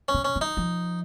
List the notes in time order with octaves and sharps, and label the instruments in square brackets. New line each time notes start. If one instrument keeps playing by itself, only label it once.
[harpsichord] C#4
[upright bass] C#3
[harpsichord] C#4
[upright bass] D#3
[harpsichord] D#4
[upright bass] F3